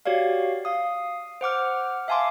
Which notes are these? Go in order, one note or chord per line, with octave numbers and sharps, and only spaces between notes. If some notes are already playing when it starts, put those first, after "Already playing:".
F#4 G4 C#5 D5 F5
F5 D#6
C5 F#5 D6 F6
E5 F5 G#5 A5 C6 D6